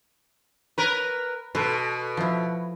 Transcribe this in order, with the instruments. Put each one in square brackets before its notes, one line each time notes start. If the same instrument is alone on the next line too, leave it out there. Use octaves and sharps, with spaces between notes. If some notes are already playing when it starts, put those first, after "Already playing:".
[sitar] A#4 B4 [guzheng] C#5
[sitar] B2 [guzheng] A4 B4 C5
[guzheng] F3 E4